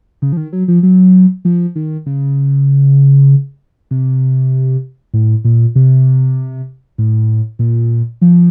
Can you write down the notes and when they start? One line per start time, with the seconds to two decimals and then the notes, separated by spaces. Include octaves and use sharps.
0.22 C#3
0.33 F3
0.37 D#3
0.53 F#3
0.68 F3
0.83 F#3
1.45 F3
1.76 D#3
2.06 C#3
3.91 C3
5.14 A2
5.45 A#2
5.76 C3
6.98 A2
7.59 A#2
8.22 F3